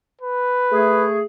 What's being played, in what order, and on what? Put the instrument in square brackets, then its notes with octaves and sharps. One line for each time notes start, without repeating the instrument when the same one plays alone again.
[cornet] B4
[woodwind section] A3 G#4